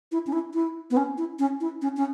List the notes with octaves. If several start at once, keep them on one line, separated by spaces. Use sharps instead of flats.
E4
C#4
E4
E4
B3
C#4
E4
C#4
E4
C#4
C#4